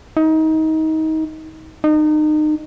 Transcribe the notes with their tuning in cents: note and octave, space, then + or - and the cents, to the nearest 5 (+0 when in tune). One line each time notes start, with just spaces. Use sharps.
D#4 +25
D#4 -30